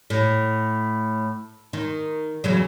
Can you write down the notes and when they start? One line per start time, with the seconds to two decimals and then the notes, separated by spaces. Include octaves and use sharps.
0.10 A2
1.73 D#3
2.44 E2 C#3 F#3